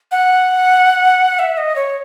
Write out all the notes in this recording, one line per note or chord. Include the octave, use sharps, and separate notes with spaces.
F#5
E5
D#5
C#5